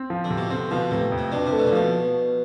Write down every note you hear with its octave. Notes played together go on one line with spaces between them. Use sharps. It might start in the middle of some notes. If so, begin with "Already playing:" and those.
Already playing: C4
F3
D3
C3
B2
D3 C4
B2 F3
A2 C3
F2
A2
B2 D4
C3
A3
B2
A2
B2 F3